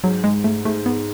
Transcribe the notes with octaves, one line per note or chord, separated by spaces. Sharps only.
G#2 F#3
G#2 G#3
G#2 A3
G#2 A3
G#2 B3